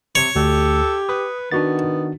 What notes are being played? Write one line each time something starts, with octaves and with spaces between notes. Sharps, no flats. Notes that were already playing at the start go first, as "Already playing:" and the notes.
C3 C#5
D2 G4 A4
B4 D#6
D#3 B3 D4 F#4 A6